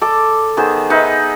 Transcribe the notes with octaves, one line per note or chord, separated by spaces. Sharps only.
A4 D5 D6
D#3 B3 G#4 C5
D#4 B4 E5